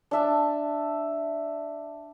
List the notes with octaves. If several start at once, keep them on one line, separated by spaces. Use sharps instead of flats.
D4 E5 A5